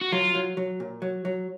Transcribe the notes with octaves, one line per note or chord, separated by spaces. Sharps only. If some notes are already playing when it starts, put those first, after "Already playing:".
F#4
F#3 F4
F#3
F#3
A#2
F#3
F#3